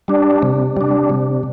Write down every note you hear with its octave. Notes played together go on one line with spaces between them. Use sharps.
G3 D4
C3
G3 D4
C3